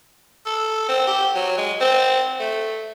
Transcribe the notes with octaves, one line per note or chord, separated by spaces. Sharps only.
A4
C4
G4
F#3
G#3
C4
A3